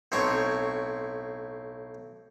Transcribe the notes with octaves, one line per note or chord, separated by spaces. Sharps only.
B1 A2 C4 C#5 C#6